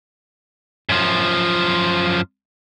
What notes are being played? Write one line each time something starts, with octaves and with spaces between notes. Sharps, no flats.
F#2 F3